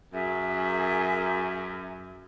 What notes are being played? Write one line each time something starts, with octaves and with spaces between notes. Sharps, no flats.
F#2 G#4 E5